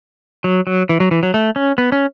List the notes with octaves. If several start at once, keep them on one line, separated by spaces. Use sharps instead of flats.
F#3
F#3
E3
F#3
E3
F#3
A3
C#4
B3
C#4